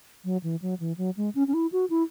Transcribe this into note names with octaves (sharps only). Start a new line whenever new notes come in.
F#3
E3
F#3
E3
F#3
G#3
C#4
C#4
E4
F#4
E4